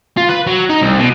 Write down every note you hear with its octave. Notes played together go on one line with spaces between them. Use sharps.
F4
B4
F#3
D#4
C2
B2